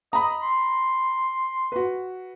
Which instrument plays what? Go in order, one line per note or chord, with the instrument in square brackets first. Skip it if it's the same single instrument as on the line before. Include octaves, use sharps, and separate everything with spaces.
[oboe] D#5 [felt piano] A#5 B5
[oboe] C6
[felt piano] F#4 B4